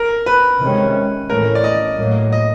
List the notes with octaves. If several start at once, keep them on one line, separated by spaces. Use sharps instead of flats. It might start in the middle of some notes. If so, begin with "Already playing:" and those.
Already playing: A#4
B4
C3 D#3 G#3 C#4
A2 E3 A3 C#4 A#4
D5
D#5
A2 F#3 A#3
D#5